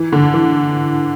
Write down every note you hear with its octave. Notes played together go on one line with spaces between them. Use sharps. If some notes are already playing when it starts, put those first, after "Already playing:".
Already playing: E3
D3
E3